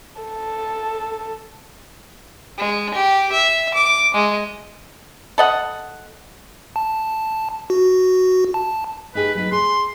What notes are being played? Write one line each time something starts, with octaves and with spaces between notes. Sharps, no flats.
A4
G#3
G4
E5
D6
G#3
A4 D#5 F#5
A5
F#4
A5
D#4 G4 G#4 B4
F#3 B3 D#4 B4
G#4 C6